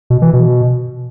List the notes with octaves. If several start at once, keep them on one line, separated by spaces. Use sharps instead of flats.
B2
E3
B2